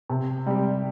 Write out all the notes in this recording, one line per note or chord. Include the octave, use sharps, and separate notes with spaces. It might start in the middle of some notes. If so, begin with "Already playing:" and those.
C3
G3 C4 G4